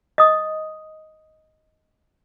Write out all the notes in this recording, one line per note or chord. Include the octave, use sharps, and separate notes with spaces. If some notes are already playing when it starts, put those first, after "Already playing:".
D#5 D#6